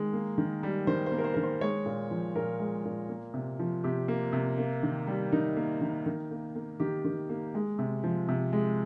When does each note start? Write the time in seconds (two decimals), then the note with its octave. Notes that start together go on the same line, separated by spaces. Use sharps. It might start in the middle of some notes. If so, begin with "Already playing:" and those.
Already playing: D#3 G#3
0.13 A#3
0.38 D#3
0.63 G3
0.87 D#3 C5
1.06 C5
1.12 A#3
1.18 A#4
1.24 C5
1.34 D#3 A#4
1.43 C5
1.61 G#3 C#5
1.86 A#2
2.11 F3
2.36 A#2 A#4
2.60 G#3
2.85 A#2
3.09 A#3
3.34 C3
3.59 F3
3.84 C3 G4
4.08 A#3
4.33 C3
4.58 A#3
4.83 D#3
5.07 G3
5.32 D#3 D#4
5.57 A#3
5.81 D#3
6.06 D#3
6.31 A#3
6.56 A#3
6.80 D#3 G4
7.05 D#3
7.30 A#3
7.55 G#3
7.79 C3
8.04 F3
8.29 C3
8.53 G#3